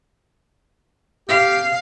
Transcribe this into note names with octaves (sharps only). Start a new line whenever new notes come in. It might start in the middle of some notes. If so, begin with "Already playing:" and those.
G4 F5